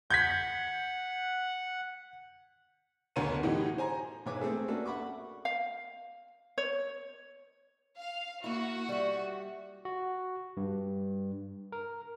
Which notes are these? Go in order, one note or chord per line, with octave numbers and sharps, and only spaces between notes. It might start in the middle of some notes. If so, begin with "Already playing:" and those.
F#5 G6 G#6 B6
F#1 D2 B3 C#5 A#5 D#7
A2 E3 D#4 F#4 G4
C5 G#5 A#5
B1 G#2 B4 C#5 G#5 D6
A3 C4 G#4 A4
A#3 C#4 D4 F#4 A4 B4
E5 F#5 B5 C#6 D6
F5
C#5
F5
A#3 E4 F#4
G3 E5
F#4
G2
A#4